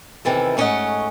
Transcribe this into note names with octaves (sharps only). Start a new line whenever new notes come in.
C3 D#3 E3 A4
G#2 A3 C#4 C#5 D#5 F#5